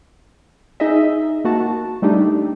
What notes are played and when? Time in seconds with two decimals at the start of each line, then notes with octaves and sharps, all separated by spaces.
0.80 D#4 G#4 D#5 E5
1.45 A#3 F#4 A5
2.02 G3 A3 D4 D#4 G4